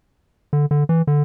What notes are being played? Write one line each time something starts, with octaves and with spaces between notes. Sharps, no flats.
D3
D3
E3
D3